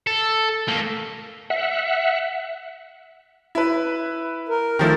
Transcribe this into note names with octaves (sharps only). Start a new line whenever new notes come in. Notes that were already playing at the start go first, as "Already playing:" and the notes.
A4
A3 A#3
E5 F#5
E4 B4
A#4
D#3 F3 A3